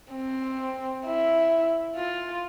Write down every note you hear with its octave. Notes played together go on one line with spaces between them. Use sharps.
C4
E4
F4